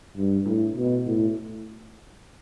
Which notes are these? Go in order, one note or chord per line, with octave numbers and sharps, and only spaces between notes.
G2
A2
B2
A2